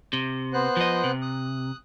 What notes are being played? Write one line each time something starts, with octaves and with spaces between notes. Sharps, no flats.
C3
B3 C5 F#6
F3 D#5
C3
D#6 F#6